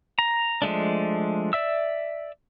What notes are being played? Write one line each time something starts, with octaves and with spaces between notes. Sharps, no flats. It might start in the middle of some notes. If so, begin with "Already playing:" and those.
A#5
F3 G#3 A3 D4
D5 E5 E6